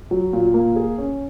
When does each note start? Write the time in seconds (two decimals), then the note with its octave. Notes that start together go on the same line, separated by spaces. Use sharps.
0.11 F#3
0.33 A#2
0.54 A#3
0.76 G#4
0.98 C#4